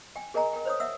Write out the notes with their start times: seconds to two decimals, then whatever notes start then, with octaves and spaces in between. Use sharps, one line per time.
0.16 G5 G#5
0.34 G#4 A#4 D#5 G#5 A#5
0.53 A#4 G5
0.65 C5 C#5 D#6
0.80 E5 F#5 E6